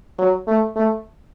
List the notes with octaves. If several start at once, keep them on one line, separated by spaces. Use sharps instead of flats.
F#3
A3
A3